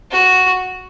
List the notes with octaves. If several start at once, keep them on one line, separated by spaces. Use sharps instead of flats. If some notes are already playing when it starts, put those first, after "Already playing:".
F#4